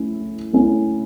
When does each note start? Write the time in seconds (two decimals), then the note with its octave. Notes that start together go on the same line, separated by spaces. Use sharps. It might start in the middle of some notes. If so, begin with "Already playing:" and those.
Already playing: A3 C#4 E4
0.53 A3 C#4 E4